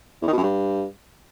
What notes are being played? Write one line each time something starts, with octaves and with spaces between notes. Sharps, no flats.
E2
D#3
B2
F#2
G2